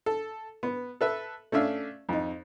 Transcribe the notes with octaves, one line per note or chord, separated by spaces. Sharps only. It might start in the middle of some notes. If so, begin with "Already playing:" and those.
A4
B3
A4 B4 E5
A3 C#4 D4 E5 F5
F2 D#4